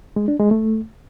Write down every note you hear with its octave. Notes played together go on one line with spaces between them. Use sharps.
G#3
D4
G#3
A3